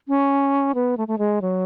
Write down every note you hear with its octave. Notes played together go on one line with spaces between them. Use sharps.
C#4
B3
A3
A3
G#3
F#3